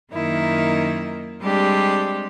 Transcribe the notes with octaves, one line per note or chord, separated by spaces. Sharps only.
F#2 D#3 A#3 D#4 E4
G3 G#3 C4 D4 G4